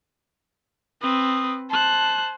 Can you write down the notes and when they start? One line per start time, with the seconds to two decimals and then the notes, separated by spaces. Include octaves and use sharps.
1.02 C4 B4 D#6
1.70 C5 A5 F#6